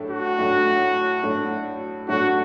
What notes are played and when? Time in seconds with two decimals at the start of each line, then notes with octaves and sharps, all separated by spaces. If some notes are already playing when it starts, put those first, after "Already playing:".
Already playing: A2 F#3 A3 D4
0.10 F#4
0.38 A2 F#3 A3 D4
1.23 A2 F#3 A3 D4
2.08 A2 F#3 A3 D4 F#4